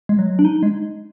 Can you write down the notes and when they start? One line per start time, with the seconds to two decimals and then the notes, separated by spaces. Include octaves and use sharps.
0.09 G#3
0.19 F#3
0.39 D4
0.44 D#4
0.63 G#3